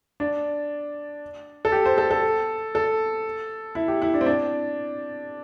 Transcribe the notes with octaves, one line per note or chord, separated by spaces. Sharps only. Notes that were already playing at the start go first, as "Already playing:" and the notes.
D4
A4
G4
C5
A4
A4
A4
E4
G4
E4
D4
C4
D4